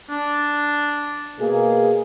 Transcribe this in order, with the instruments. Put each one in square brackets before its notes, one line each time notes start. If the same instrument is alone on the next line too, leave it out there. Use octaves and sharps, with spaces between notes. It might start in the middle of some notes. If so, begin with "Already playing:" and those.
[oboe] D4
[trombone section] B2 A#3 G#4